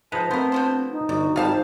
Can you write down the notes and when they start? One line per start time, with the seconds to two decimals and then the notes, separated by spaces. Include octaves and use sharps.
0.12 F3 G#3 D#4 B4 C5 A5
0.31 A3 B3 C4 A#4 C5
0.52 D3 F3 C5
0.91 D#4
1.09 G1 F#4 D5
1.36 G#1 G3 F4 C5 F5 A5